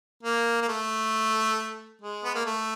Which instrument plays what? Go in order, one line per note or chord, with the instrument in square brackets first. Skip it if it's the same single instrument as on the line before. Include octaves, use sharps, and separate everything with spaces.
[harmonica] A#3
A#3
A3
G#3
B3
A#3
A3